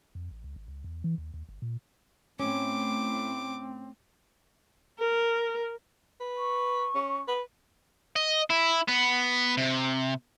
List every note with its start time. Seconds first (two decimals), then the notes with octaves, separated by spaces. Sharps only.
0.15 F2
0.31 A1
0.44 C#2
0.56 G#1
0.68 C#2
0.84 E2
1.04 E3
1.18 D#2
1.34 D#2
1.49 G1
1.62 A#2
2.40 A2 C4 C#4 D6
4.98 A#4
6.20 B4
6.37 C#6
6.95 C#4
7.28 B4
8.16 D#5
8.50 E4
8.88 B3
9.57 C3